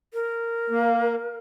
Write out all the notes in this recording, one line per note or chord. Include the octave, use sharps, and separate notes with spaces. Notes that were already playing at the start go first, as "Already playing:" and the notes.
A#4
A#3